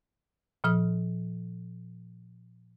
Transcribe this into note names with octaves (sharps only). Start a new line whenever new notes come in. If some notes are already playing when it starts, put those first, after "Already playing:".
A#2 F3 D#6 F6